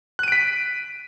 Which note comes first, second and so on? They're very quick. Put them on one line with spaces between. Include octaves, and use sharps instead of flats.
F#6 D#7 D7 B6